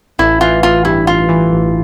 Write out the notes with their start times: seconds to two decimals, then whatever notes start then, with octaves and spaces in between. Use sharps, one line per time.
0.19 A1 E4
0.41 E3 F4
0.63 A1 F4
0.85 G2 E4
1.07 A1 F4
1.29 E3
1.52 A1